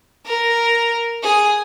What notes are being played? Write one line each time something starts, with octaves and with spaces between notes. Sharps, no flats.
A#4
G#4